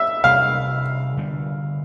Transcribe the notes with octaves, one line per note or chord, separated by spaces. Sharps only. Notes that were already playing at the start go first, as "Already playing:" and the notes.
Already playing: E5
C3 G3 B3 D4 F5
D3 G3 B3